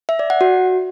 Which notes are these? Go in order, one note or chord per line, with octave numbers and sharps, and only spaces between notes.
E5
D5
F#5
F#4